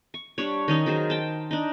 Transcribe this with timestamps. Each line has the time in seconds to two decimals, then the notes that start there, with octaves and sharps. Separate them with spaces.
0.14 C#6
0.38 G3 D4 C#5
0.68 D#3 C#4 D#4
0.86 D#3 F#3 G#4 C5
1.10 G5 A5
1.51 D4 D#4